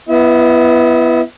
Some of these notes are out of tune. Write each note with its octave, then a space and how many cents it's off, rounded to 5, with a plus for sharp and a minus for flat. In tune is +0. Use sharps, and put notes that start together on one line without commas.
B3 +0 E4 +30 E5 -40